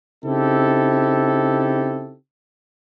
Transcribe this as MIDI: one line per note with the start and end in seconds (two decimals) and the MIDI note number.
0.24 2.15 49
0.24 2.15 60
0.24 2.15 63
0.24 2.15 64
0.24 2.15 67
0.24 2.15 69